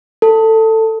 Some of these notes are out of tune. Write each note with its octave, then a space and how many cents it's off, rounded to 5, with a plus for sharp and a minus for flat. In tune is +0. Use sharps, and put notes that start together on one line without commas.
A4 +15